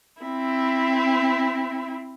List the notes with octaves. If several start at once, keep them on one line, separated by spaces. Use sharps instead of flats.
C4 E4